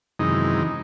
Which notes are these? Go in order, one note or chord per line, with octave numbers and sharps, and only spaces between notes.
F#2 C3 D#3 E3 G#3 D#4